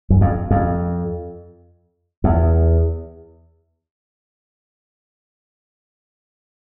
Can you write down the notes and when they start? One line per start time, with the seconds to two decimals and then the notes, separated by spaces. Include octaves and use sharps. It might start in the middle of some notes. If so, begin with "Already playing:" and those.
0.10 F#2
0.21 F2
0.51 F2
2.24 E2